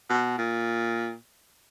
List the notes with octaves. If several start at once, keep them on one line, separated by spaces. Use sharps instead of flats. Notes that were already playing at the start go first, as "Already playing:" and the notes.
B2
A#2